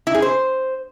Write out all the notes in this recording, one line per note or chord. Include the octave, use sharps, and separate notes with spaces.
E4
G#4
C5